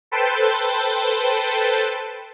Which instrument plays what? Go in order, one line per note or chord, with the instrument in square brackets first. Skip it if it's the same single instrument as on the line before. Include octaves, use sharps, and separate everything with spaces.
[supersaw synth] A4 B4 C5 G5 A5